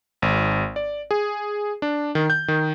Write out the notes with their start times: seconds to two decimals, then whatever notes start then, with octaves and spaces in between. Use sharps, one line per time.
0.22 G#1
0.76 D5
1.11 G#4
1.82 D4
2.15 D#3
2.30 G6
2.48 D#3